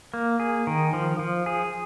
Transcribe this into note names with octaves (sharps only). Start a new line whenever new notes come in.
A#3
G#4
D#3
F3
F3
G#4